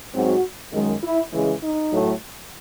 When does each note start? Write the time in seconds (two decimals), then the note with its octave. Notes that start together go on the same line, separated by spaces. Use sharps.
0.14 G#2 F#3 C4 F#4
0.72 F#2 D#3 G#3
1.03 E4
1.32 C#3 E3 G#3
1.61 D#4
1.91 A2 F#3 A3